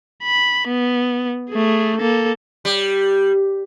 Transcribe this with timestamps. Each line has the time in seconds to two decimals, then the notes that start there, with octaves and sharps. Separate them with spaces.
0.23 B5
0.68 B3
1.50 A3 G#4
1.99 A#3 A4
2.65 G3